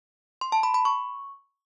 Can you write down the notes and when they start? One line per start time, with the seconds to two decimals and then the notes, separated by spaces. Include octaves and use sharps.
0.41 C6
0.52 A5
0.63 B5
0.74 B5
0.85 C#6